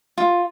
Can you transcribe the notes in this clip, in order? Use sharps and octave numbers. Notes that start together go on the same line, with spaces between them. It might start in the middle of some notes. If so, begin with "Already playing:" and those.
F4